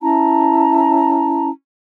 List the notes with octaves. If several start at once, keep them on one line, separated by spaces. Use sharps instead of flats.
C#4 E4 A5 A#5